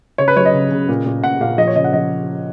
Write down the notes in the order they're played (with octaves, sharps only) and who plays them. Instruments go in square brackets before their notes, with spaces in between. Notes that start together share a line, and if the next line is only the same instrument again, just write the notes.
[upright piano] C#3 C#5
B4
F#3 C#5
D#5
C#3
C#3
A#2
A#2
A#2 F#5
A#2 F5
F3 D#5
C#5
C#3 D#5
F#5
F3 D#5